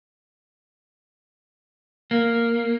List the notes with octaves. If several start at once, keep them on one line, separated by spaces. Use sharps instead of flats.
A#3